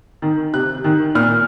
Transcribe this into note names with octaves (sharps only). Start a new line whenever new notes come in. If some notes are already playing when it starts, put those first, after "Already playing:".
D#3
C3 F#6
D#3
A#2 F6